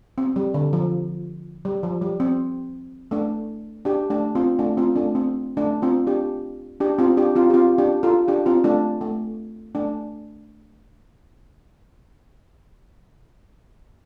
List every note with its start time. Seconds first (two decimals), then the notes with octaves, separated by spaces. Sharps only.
0.18 C4
0.36 G3
0.54 D3
0.73 F3
1.65 G3
1.83 F3
2.02 G3
2.20 C4
3.11 A3 D4
3.85 D4 G4
4.10 A3 D4
4.35 C4 F4
4.59 A3 D4
4.77 C4 F4
4.96 A3 D4
5.15 C4
5.57 A3 D4
5.82 C4 F4
6.07 D4 G4
6.80 D4 G4
6.98 C4 F4
7.17 D4 G4
7.35 C4 F4
7.50 G4
7.54 C4 F4
7.78 D4 G4
8.03 F4 A4
8.28 D4 G4
8.46 C4 F4
8.64 A3 D4
9.01 A3
9.75 A3 D4